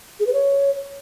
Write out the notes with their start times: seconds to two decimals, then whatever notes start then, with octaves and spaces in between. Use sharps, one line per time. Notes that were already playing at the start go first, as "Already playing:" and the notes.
0.20 G#4
0.27 B4
0.33 C#5